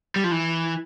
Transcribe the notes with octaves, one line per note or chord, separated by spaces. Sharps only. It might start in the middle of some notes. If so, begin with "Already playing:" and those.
G3
F3
E3